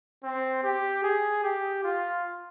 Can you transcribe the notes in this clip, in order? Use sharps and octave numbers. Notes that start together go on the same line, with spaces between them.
C4
G4
G#4
G4
F4